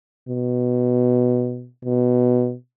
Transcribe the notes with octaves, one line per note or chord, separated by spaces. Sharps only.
B2
B2